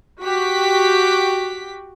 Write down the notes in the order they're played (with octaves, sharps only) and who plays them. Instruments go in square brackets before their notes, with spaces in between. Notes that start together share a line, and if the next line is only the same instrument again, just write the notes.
[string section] F#4 G4 B6